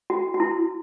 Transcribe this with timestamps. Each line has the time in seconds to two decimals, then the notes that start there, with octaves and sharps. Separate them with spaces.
0.10 F#4
0.34 F#4
0.40 E4